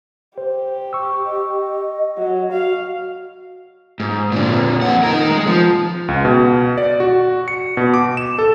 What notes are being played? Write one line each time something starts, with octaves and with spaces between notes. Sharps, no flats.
G4 C5
C#6 E6
D#5
F#3
F#4 F5
G#2
A#2 D3
F2 F#5
D#4 A#4
G#3
F3
C#2
B2
D5
F#4
C#7
B2
D6
E7
A4